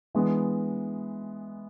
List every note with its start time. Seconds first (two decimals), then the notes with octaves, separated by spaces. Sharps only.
0.15 E3 G#3 B3 D4